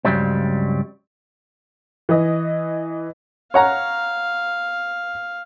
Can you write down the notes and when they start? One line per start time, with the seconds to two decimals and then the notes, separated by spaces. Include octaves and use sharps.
0.05 C#2 G2 C#3 F#3 G3 C4
2.09 E3 D#5
3.54 C#5 F5 F#5 A#5